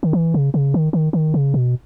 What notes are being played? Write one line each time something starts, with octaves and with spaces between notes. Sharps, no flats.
D#3
E3
C#3
C#3
D#3
D#3
D#3
C#3
B2